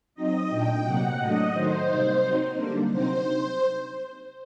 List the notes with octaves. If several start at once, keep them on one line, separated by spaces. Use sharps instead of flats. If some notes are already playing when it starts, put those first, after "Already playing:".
F#3 C4 D#4 D#5
A#2 A3 D4 G5
C3 F#3 A#3 F#5
A2 F#3 A3 D4 D#5
D#3 F#3 A3 D#4 C5
C3 G3 A#3 D#4
F#3 C4 D#4
D3 G3 A#3 D4
C3 F#3 C4 D#4 C5